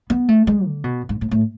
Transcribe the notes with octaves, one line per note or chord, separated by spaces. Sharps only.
B3
A3
G#3
D3
B2
G#2
A2
A2